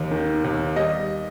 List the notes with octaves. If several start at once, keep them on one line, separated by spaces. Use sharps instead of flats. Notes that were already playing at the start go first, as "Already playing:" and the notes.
Already playing: D#2 D#3
D#3
D#2
G3 D#5